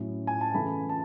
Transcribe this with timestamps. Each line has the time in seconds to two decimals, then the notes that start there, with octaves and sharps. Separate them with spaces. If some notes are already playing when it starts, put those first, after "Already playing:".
Already playing: A2 F#3 C#4 E4
0.27 G#5
0.41 A5
0.54 C#3 E3 A3 E4 B5
0.89 A5